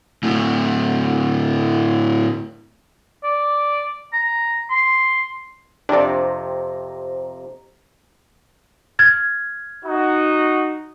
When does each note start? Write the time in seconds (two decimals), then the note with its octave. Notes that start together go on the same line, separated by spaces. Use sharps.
0.23 D2 A2
3.24 D5
4.13 A#5
4.70 C6
5.89 F2 C3 D4 G4 C5 D5 A#5
8.99 F6 G#6 A6
9.84 D#4 F#4